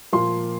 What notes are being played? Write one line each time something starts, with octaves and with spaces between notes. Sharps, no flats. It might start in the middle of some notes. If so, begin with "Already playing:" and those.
A#2 F3 A#3 F4 C6